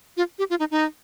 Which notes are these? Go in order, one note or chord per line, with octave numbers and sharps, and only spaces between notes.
F4
G4
F4
D#4
D#4